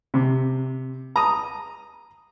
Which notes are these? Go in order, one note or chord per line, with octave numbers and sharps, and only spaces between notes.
C3
A#5 D#6